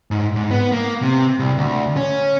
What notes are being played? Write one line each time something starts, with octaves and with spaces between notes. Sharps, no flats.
G#2
G#2
B3
A#3
C3
C2
D2
C#4